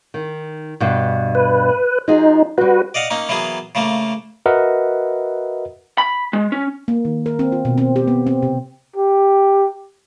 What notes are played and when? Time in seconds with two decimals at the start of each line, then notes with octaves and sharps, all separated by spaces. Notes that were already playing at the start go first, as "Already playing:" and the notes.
0.14 D#3
0.80 G2 B2
1.35 B4
2.08 F3 D#4 F#4 G#4
2.58 G3 C4 F#4 B4
2.94 D5 D#5 F5 F#5
3.10 A#3 C#4 D#4
3.29 E3 F#3 A#3 B3 G#4
3.75 C#3 F3 A3 A#3
4.46 F#4 A#4 B4 D#5 E5 F#5
5.98 B5
6.33 G#3
6.52 C#4
6.88 A#3
7.05 D#3
7.26 A#4
7.39 C4
7.52 F4
7.65 B2
7.78 C4
7.96 G4
8.08 B3
8.27 C4
8.42 C3
8.96 G4